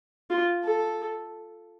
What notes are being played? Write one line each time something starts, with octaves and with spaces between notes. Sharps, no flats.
F4
A4